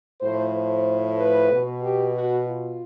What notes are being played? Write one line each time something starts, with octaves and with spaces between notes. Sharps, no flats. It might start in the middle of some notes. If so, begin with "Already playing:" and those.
A2 F3 C5
C5
B4
B2
G4
F#4
F4